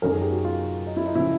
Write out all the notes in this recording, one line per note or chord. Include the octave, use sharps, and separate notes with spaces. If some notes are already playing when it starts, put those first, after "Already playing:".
F#2 D#3 F#3 A#4
G#4
G4
F#4
F4
D#4
E4
D#4
C#3 F3 E4